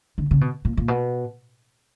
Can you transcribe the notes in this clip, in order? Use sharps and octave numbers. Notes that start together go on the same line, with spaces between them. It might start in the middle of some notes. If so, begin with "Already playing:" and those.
D3
C#3
B2
A#2
A#2
B2